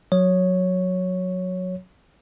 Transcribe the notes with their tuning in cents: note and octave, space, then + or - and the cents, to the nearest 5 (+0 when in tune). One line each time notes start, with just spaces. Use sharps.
F#3 -20 C#5 +0